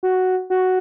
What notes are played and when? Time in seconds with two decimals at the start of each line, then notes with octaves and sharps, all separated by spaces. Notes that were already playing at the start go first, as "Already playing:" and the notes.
0.03 F#4
0.50 F#4